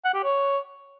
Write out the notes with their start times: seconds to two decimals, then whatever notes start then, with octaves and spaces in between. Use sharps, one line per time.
0.05 F#5
0.14 G4
0.23 C#5